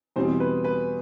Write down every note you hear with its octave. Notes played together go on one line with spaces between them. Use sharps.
E2 B2 G3 C4 C5
B4
B4